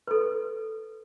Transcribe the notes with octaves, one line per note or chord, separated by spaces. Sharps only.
A4 B4